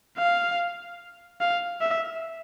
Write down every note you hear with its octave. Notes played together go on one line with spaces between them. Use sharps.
F5
F5
E5